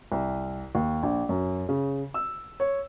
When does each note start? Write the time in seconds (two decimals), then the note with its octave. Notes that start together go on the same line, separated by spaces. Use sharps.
0.12 C2
0.75 D#2
1.03 A#1
1.29 F#2
1.69 C#3
2.14 E6
2.60 C#5